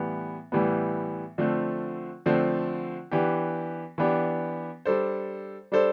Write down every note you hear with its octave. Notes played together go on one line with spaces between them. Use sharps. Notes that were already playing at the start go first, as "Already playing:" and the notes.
Already playing: A2 E3 G3 B3
A2 E3 G3 B3
D3 F3 A3 C4
D3 F3 A3 C4
E3 B3 D4 G4
E3 B3 D4 G4
G3 D4 A4 C5
G3 D4 A4 C5